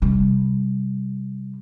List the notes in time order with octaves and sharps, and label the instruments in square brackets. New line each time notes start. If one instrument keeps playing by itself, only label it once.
[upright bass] C3 G3